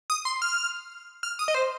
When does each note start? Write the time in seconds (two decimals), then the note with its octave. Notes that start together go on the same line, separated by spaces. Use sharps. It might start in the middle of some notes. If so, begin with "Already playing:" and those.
0.10 D#6
0.25 C6
0.42 F6
1.23 F6
1.39 D#6
1.48 D#5
1.55 C5